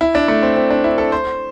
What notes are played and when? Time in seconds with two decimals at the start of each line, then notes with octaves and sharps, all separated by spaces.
0.01 E4
0.15 D4
0.28 A3
0.43 C4
0.56 C4
0.70 D4
0.84 E4
0.98 A4
1.12 C5